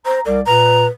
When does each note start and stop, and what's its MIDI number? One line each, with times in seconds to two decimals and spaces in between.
0.06 0.20 72
0.06 0.20 82
0.25 0.40 36
0.25 0.40 70
0.25 0.40 74
0.46 0.86 46
0.46 0.88 71
0.46 0.86 82